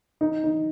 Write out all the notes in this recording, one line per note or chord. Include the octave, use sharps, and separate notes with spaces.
D#4
D#4